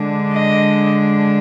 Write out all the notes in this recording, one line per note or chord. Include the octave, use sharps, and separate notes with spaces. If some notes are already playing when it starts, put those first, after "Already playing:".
Already playing: D3 G#3 D4
D#5